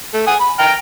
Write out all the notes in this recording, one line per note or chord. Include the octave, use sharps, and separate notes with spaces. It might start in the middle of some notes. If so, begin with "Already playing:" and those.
A3
F#5 G#5 D#6
B5
G5 A#5 F6